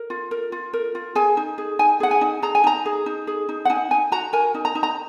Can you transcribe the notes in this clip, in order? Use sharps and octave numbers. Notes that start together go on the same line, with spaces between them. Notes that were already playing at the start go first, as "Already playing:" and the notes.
Already playing: A#4
F4
A#4
F4
A#4
F4
G#4 G#5
D#4
G#4
D#4 G#5
G#4 F#5
G#5
D#4
G#4 A#5
G#5
D#4 A#5
G#4
D#4
G#4
D#4
F#5
D#4 G#5
D#4 G#5
F#4 A#5
A#4 G#5
D#4
A#5
D#4
A#5